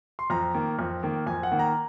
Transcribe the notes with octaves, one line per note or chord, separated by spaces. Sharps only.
C6
F2 A#5
D#3 A#3
F2
D#3 A#3
F2 G#5
F#5
D#3 A#3
A#5